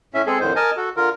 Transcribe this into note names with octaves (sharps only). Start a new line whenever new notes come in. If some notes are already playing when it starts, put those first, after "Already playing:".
A2 C#4 E5
G#3 C4 G#4 A4
F2 A2 D3 D#3 C5
A#4 D#5 G#5 A5
F#4 A4
D3 F4 A#4